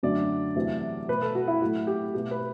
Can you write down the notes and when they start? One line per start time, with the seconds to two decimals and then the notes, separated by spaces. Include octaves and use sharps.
0.03 F#2 D3 F#3 A3 D5
0.56 E2 C3 F#3 A3
1.08 B2 A3 B4
1.22 A4
1.35 F#4
1.48 E4
1.61 A2 F#3 A3 F#4
1.87 G4
2.14 B2 A3 G4
2.31 B4